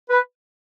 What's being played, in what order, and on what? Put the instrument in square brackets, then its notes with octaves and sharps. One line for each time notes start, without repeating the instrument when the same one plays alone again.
[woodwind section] B4